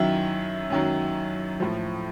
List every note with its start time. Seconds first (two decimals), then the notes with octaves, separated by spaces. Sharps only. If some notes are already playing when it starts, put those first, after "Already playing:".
Already playing: F#2 D#3 F#3 E4 E5
0.70 F#2 D#3 F#3
1.60 A2 F3